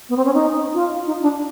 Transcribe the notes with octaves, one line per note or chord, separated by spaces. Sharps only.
B3
C4
C#4
D#4
F4
D#4
D4